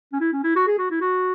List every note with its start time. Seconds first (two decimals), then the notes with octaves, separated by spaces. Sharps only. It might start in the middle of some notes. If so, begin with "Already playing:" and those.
0.13 C#4
0.20 E4
0.33 C#4
0.44 E4
0.56 F#4
0.67 G#4
0.78 F#4
0.90 E4
1.01 F#4